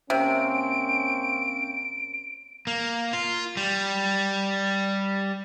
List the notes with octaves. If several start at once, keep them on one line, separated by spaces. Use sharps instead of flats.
C3 A#3 C4 C#4 D7
A#3
F4
G3